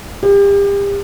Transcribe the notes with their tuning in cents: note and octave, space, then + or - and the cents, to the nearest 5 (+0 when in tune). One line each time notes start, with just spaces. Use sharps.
G4 +35